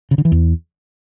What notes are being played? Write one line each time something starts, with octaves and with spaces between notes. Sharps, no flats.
C#3
D3
E3
E2